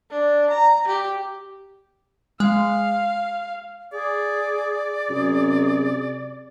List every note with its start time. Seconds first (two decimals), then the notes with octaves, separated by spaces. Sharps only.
0.11 D4
0.50 A#5
0.88 G4
2.40 G#3 F5
3.93 G#4 D5
5.09 F#2 C3 G#4